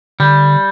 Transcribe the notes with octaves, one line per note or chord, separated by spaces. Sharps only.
D3 G3